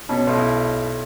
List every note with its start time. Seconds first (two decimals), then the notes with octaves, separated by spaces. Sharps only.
0.09 B2 C#4
0.27 B1
0.36 E4